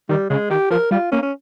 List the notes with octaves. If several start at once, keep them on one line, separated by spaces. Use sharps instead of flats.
D#3 G3
C#3 G#3
D#3 G4
F3 A#4
G3 F4
A#3 C#4
C#4